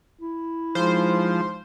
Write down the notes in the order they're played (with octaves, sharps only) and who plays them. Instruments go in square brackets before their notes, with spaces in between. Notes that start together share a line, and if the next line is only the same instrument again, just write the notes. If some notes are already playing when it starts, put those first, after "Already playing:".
[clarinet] E4
[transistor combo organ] F3 [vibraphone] G#3 D#4 G#4 [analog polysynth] C5